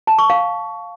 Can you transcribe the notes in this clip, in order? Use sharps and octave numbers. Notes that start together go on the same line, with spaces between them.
A5
C#6
F5